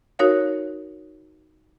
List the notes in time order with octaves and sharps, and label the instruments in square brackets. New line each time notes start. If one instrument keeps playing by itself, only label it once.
[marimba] D#4 F#4 A#4 C#5 F5